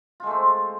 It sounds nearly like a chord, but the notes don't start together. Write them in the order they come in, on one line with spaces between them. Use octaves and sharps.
F4 G#3 A3 C4